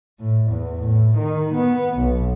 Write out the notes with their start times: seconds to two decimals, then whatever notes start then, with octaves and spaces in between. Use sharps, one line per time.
0.19 A2
0.50 E2
0.80 A2
1.17 D#3
1.54 B3
1.97 B1